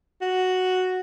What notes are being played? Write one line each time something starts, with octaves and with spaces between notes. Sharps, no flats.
F#4